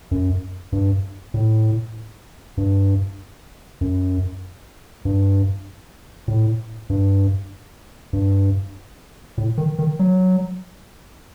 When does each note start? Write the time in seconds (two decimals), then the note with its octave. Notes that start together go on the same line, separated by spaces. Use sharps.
0.11 F#2
0.72 G2
1.34 A2
2.57 G2
3.81 F#2
5.05 G2
6.28 A2
6.90 G2
8.13 G2
9.38 A2
9.58 D#3
9.79 D#3
9.99 F#3